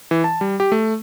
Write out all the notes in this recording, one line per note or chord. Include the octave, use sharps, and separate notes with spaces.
E3
A5
G3
G4
A3